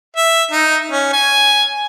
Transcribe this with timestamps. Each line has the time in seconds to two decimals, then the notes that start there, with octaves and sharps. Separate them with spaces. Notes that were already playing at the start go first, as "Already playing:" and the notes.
0.17 E5
0.51 D#4
0.92 C#4
1.13 G#5